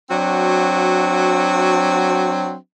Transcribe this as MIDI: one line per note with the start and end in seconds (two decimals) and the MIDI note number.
0.10 2.54 54
0.10 2.54 60
0.10 2.54 62
0.10 2.54 66